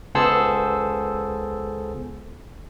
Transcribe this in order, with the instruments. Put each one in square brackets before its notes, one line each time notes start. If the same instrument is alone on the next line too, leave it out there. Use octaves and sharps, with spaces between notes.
[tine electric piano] C#2 B3 G#4 A4 C5 E6